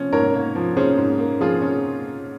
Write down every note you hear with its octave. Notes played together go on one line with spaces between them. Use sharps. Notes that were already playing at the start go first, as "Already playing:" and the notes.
Already playing: F3 C#4
G#2 A#4 C#5
A#3
F3
C#4 G#4 C5
G#2
A#3
F3 F4 G#4
C#4